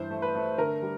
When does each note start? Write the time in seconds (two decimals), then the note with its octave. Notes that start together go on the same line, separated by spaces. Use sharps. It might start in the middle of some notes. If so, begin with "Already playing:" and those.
Already playing: G2 E3 C5
0.11 A3
0.22 B4
0.35 A3
0.58 D3 A#4
0.82 G3